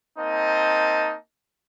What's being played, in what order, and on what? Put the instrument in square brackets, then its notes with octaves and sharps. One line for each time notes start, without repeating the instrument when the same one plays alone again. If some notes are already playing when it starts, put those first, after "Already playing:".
[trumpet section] A#3 C4 D#4 D#5 A5